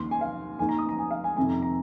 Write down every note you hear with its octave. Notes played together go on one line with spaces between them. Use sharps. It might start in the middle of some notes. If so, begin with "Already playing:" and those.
Already playing: D#2 D#3 C6
G#5
F5
D#2 D#3 G#5
A#5
D#6
A#5
G#5
F5
G#5
F2 C3 D#3 G#5
A#5
A#5